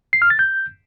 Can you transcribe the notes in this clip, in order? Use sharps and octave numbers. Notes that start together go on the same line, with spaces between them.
C7
F6
A6
G6